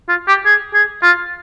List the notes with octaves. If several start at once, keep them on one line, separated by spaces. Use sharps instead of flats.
F4
G4
G#4
G#4
F4